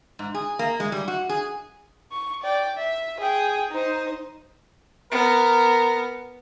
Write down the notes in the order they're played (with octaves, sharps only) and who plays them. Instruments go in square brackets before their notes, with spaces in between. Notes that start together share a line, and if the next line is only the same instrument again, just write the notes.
[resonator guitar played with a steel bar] G#2
G#4
A#3
G#3
G3
F#4
G#4
[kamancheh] C#6
D5 G5
E5
G#4 G5
D#4 C5
[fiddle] B3 [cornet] A#4